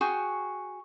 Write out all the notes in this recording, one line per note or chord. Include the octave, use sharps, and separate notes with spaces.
F#4 G#4 G5 C#6